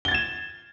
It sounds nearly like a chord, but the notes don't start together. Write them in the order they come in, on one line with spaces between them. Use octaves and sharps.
G7 A6 G#6 E7